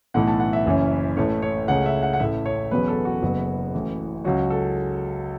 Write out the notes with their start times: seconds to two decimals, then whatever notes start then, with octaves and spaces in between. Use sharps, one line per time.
0.14 B1 A2 E3 A3 F#5
0.28 A5
0.40 F#5
0.53 E5
0.66 F#1 F#2 E3 C#4
1.17 A1 A2 A3 C#5
1.42 C#5
1.68 C#2 C#3 A3 C#4 F#5
1.86 E5
2.03 F#5
2.13 F#5
2.20 A1 A2 A3 E5
2.46 C#5
2.71 E1 E2 B2 F#3 C#4 B4
2.88 A4
3.05 F#4
3.23 F#1 F#2 F#3 B3
3.74 A1 A2 E3
4.24 C#2 C#3 F#3 C#4 F#4
4.50 A4